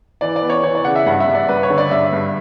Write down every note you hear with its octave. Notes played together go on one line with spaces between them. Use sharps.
E3 D5
D5
B3
C#5
E3 C#5
D5
C#3 F#5
E5
G2 F#5
E5
G2
D5
G2 B4
C#5
D3
D5
G2 E5
G2